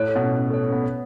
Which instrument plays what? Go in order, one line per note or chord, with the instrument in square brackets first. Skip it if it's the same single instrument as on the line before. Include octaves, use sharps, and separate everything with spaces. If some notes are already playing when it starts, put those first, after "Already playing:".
Already playing: [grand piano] A2 [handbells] C#5
[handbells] A4
[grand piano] B2
[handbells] C#4
C#4
[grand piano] A3
[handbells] C#5
[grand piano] B3 [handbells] C#4
[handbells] C#5